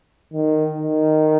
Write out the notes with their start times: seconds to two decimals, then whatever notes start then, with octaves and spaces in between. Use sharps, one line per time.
0.33 D#3
0.78 D#3